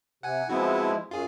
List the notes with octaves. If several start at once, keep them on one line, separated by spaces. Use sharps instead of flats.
C3 F#5 G#5
F3 G#3 B3 C4 E4 F#4
F#2 F4 G#4